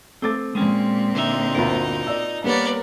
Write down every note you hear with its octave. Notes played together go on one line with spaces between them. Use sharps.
A3 C4 A4 D6 A6
A#2 G#3 C4 C#4
D3 D#4 E5
G1 D2 F4 A#4
D5 D#5 E6
G3 A#3 B3 A#4 C#5 D5